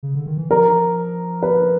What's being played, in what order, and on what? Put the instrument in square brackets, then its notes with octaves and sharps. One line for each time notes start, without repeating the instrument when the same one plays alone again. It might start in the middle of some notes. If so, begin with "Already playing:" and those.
[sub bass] C#3
D3
D#3
E3
[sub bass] F3 [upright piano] A#4
[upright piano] B4